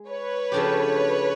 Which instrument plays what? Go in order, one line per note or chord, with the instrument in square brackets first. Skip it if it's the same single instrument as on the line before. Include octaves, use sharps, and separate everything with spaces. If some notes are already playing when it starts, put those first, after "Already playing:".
Already playing: [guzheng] G#3
[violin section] B4 C#5
[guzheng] C#3 F3 A3 D4 G4